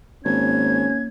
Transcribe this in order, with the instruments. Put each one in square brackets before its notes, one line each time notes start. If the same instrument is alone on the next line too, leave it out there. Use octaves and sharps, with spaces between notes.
[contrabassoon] G#1 [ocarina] A#3 [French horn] C#4 [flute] G#6